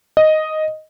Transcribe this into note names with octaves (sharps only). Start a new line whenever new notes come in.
D#5